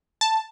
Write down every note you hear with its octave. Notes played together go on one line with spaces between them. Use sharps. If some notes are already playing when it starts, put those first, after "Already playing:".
A5